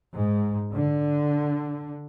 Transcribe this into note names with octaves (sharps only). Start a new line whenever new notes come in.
G#2
D3